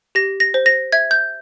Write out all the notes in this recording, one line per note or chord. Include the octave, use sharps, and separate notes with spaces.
G4 A#6
A#6
C5
A#6
E5 G#6
G6